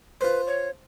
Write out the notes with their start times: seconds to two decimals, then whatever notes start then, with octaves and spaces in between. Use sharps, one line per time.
0.21 F4 B4 C5
0.47 C#5